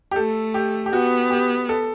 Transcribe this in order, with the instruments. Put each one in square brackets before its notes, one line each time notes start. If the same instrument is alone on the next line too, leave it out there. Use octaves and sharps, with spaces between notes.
[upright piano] G4
[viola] A3 [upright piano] A4
[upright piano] G4
G4
[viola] B3 [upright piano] F#4
[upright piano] G4
A4